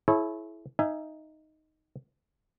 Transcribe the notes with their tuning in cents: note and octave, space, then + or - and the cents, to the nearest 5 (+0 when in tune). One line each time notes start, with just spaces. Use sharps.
E4 +0 G#4 +45 C#5 -30
D#4 +0 E5 +20 G#5 +0